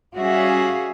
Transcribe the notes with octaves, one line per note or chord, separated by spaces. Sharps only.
G3 C#4 F#4 G#4 E5 F5